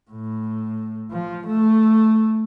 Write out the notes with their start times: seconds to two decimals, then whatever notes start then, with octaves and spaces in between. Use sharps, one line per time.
0.10 A2
1.11 F3
1.46 A3